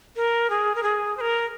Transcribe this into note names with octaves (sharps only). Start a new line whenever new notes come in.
A#4
G#4
A#4
G#4
C5
A#4